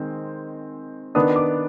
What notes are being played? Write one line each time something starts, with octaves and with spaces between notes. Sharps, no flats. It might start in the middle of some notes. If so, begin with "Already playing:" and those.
Already playing: D#3 G#3 C4
D#3 B3 D4 D#6
D6